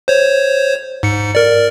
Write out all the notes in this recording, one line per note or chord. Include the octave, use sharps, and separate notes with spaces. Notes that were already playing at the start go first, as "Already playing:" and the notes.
C5 C#5
G#2 C#7
A#4 D5